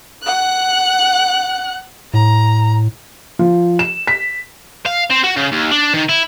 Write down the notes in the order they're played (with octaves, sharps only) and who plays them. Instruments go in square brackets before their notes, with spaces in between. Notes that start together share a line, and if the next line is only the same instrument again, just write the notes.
[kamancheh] F#5 F#6
[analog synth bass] A2 [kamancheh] A#5
[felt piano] F3
E7
B6
[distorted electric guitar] F5
C4
F#4
C#3
D#2
D4
D#3
E4